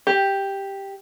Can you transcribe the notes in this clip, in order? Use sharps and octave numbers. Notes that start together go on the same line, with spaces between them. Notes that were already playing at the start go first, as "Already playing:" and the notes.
G4